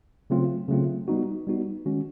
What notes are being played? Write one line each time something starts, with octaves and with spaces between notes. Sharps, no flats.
C#3 F#3 A3 C4 F4
C#3 F#3 A3 C4 F4
G3 B3 D#4 F#4
G3 B3 D#4 F#4
D#3 G#3 C#4 F#4